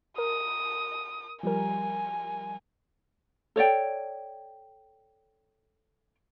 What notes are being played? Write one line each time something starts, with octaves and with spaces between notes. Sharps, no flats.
A#4 D#6
F3 G3 A#4 G#5
A4 C#5 D5 G5